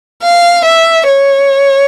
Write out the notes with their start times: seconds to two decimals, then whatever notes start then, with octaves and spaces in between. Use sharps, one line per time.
0.23 F5
0.65 E5
1.08 C#5